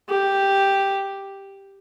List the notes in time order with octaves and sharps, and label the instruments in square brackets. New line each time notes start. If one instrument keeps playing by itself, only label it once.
[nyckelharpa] G4